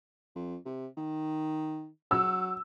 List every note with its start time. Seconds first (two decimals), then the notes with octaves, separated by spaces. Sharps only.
0.36 F2
0.65 C3
0.97 D#3
2.11 F#3 E6